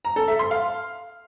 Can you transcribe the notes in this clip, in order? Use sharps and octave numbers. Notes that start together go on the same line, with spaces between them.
A#5
A4
E5
C6
F5